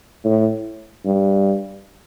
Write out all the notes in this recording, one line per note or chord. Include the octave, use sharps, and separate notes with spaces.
A2
G2